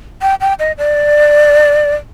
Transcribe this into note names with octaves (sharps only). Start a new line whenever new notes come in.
G5
G5
D#5
D5